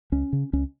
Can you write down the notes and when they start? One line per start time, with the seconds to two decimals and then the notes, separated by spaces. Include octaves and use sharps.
0.12 C#2 C#4
0.33 C#3
0.53 C#2 C#4